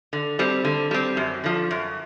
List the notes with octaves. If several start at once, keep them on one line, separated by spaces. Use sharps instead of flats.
D3
G3 C4
D3
G3 C4
F#2
D3 F3
F#2